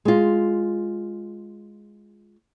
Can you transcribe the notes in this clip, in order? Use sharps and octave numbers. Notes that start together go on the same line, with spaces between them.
G#3 F4